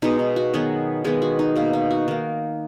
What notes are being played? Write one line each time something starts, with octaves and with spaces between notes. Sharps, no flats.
B2 G#3 B3 D#4
D#4
F#4
D#3 F#3 B3 G#4
D#3 G#3 B3 G#4
F#4
D#4
B2 A#3
D#4
F#4
D#3 A#3